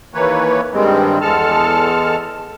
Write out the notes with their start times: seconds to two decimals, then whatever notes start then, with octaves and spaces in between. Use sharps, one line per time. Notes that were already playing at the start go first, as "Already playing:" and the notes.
0.14 D#2 E3 A#3 B4 C#5
0.74 G2 D#3 G3 G#3 C4
1.21 E2 G#3 A4 A5 F6